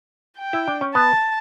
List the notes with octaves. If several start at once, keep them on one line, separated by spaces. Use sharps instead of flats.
G5
E4
D4
C#4
B3 A5